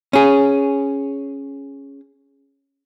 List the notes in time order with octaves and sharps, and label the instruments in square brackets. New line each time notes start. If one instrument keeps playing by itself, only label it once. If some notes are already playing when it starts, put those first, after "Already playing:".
[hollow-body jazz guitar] C#4 G#4